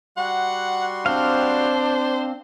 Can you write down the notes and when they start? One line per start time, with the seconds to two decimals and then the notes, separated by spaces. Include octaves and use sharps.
0.17 G3 F#4 F#5 C6
1.06 C4 D4 C5 F5